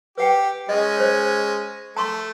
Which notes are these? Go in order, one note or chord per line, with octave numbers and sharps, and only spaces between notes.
G4 B4 F#5 G5
G#3 C#4 D#5
C5 C#5
A3 A5 C6 C#6